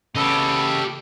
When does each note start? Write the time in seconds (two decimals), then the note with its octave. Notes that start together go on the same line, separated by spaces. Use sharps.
0.16 C#3 B3 G4 A4 D#5